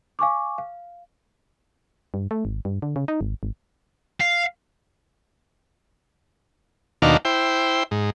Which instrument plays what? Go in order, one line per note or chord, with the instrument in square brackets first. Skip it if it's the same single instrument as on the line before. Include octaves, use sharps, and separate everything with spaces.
[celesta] F5 G#5 C#6 D6
F5
[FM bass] G2
A3
G#1
G2
D3
C#3
D#4
G#1
G#1
[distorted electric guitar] F5
[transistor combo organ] D#2 B2 D#3 D4 F#4 F5
E4 C5 G5
G#2